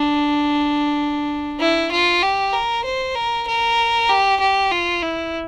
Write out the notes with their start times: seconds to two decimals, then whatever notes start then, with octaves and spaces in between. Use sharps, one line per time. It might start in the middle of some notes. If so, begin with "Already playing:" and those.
Already playing: D4
1.59 E4
1.92 F4
2.22 G4
2.53 A#4
2.85 C5
3.15 A#4
3.47 A#4
4.09 G4
4.40 G4
4.72 F4
5.02 E4